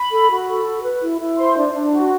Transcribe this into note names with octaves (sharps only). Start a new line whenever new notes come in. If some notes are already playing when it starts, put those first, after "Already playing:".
Already playing: B5
A4
F#4
A4
F#4
B4
E4
E4
C5 C6
D4
D4
F#4